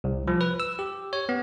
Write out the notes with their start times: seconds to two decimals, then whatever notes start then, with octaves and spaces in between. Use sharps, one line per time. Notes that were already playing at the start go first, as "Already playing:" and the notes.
0.04 C2
0.28 F3
0.41 B4
0.60 E6
0.79 G4
1.13 C#5
1.29 B3